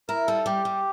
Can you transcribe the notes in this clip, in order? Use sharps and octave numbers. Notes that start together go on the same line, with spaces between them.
E4 A#4
G3 A4
G3 G4
G3